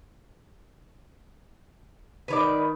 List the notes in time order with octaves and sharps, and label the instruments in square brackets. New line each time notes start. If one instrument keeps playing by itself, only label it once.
[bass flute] D#3 [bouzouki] B4 C#5 D5